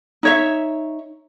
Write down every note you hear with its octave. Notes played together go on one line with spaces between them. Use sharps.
D#4 C#5 E5